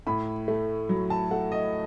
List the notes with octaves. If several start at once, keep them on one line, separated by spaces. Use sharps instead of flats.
A2 B5
A3
F#3
A5
A3 F#5
D#5